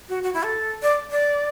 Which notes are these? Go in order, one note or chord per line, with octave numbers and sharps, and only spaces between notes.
F#4
F#4
E4
A4
D5
D5